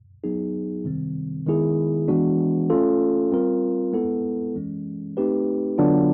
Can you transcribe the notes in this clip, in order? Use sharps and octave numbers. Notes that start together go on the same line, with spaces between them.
F#3 B3 D#4 G#4
C3 D#3 G3 C4
D#3 G#3 B3 E4 G#4
E3 G#3 B3 D4 F#4
A3 C#4 F4 A4
G3 C4 F4 A#4
G#3 B3 E4 A4
E3 G#3 C#4
A3 C4 D#4 G4 B4
D3 F#3 B3 D4 F4